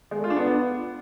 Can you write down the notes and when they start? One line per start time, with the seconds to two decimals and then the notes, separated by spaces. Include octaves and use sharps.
0.11 G#3
0.18 A3
0.24 F4
0.30 D4
0.36 B3